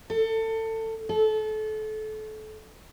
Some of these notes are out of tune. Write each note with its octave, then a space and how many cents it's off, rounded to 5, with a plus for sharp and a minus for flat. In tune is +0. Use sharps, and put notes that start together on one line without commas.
A4 +25
A4 -30